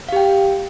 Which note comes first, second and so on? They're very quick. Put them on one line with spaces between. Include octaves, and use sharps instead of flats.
F5 G4 G5